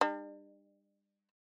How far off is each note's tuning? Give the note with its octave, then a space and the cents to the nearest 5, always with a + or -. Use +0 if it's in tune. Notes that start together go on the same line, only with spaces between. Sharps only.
G3 +30 D4 +45